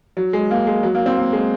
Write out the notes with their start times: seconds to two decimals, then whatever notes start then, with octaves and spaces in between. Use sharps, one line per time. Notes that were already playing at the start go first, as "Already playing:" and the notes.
0.17 F#3
0.33 G#3
0.51 A#3
0.67 G#3
0.83 F#3
0.95 A#3
1.06 C4
1.17 A#3
1.33 G#3